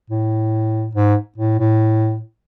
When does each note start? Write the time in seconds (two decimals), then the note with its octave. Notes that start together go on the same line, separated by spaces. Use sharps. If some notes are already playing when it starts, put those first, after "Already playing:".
0.10 A2
0.95 G#2
1.38 A2
1.60 A2